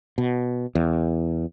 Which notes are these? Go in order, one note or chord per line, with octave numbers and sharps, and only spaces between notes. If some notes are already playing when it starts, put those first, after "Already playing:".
B2
E2